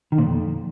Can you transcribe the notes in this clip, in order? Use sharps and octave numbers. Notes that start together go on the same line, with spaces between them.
D#3
A#2
F2